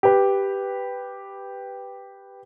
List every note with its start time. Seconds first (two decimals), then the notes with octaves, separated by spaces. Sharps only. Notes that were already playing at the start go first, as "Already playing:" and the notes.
0.03 G4 B4